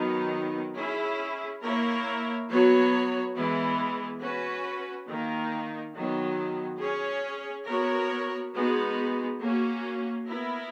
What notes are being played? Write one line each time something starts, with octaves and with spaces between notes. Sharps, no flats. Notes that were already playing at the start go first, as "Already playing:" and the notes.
Already playing: D#3 F#3 B3 D#4
C#4 E4 G#4
A#3 E4 A#4 C#5
F#3 B3 F#4 C#5
E3 G#3 B3 E4
C#4 F#4 B4
D#3 A#3 D#4
D#3 F#3 B3
C#4 G#4 C#5
B3 F#4 A#4 C#5
G#3 B3 D#4 F#4
A#3 C#4 F#4
B3 E4 A#4